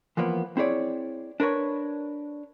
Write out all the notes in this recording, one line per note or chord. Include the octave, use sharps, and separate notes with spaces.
E3 F3 A#3 B3
C4 E4 G#4 C#5 D5
D4 A#4 B4 C#5